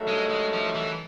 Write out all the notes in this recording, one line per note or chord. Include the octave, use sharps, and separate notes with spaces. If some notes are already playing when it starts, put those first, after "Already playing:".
Already playing: G2 D#3 F#3 A3
G#3
G#3
F3
E3